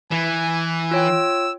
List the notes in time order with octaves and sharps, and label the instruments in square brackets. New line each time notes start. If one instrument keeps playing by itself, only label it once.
[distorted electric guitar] E3 [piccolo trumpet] G#5
[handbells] F4 C#5 G5 [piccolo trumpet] E6